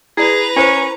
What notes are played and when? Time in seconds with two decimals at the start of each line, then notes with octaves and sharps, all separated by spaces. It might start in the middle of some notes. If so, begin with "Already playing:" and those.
0.17 E4 G#4 B4 D5 A#5
0.57 C#4 E4 A#4 C5